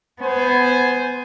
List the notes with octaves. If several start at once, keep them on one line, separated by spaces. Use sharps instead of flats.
B3 C5 G#5